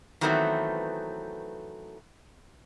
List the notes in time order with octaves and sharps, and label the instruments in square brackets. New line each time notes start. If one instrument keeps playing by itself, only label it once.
[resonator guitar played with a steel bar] D#3 E3 F#3 A3 B3 C4